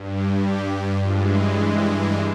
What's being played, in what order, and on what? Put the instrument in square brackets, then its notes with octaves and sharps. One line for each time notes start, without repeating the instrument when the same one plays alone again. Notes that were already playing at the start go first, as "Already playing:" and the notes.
Already playing: [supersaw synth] G2
G3 G4
G3 G4
G2 E3 F3 G#3 F4
C#3 C#4
C3 C4
A#3